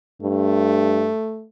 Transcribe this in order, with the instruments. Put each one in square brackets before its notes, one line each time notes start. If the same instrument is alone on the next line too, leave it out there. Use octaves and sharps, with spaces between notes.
[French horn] G2 [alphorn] A3